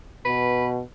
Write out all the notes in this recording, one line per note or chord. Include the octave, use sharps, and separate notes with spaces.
B2 B4